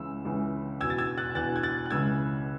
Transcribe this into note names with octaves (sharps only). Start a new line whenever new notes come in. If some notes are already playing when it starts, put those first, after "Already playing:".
Already playing: C#2 C#3 E3 E6
C#2 C#3 E3
E2 B2 E6 G#6
A6
E6 G#6
F#6 A6
E2 B2 F#6 A6
G#6
F#6 A6
F#6
C#2 C#3 E3 E6 G#6